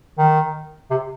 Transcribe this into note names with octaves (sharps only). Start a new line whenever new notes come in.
D#3
C3